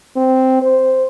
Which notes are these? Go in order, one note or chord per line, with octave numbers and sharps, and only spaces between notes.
C4
C5